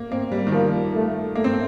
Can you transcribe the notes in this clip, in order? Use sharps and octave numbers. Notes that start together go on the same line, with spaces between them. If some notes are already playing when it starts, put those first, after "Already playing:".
Already playing: A#3
A#3 C4
G3
D#3
F3 A#3
A3
A3 A#3
C4